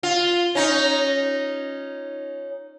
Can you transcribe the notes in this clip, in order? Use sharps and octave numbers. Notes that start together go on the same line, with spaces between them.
F4
C#4 D#4